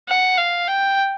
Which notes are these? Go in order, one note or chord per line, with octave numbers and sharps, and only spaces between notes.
F#5
F5
G5